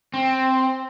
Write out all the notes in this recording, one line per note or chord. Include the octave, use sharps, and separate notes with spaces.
C4